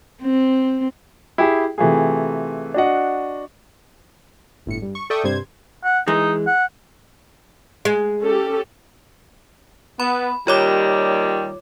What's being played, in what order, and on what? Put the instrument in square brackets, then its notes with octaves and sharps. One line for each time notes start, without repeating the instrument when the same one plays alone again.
[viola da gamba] C4
[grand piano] E4 G4 G#4
C3 E3 A3 F4 G#4
D4 F#4 D#5 F#5
[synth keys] G1 A2 C#7
G2
C#6
A4 D5 E5 G5 C#6 D#6
G2 C3 G3 C5 G#6
[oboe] F#5
[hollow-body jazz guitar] E3 G#3 [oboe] D#4
[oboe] F#5
[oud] G#3
[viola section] C#4 G4 A4
[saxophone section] B3 [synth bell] B5
[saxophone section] D#2 D#3 G3 [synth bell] F4 C#5 D6